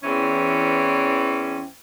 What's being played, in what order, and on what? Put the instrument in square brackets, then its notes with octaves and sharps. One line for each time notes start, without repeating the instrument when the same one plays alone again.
[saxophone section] E2 E3 C4 C#4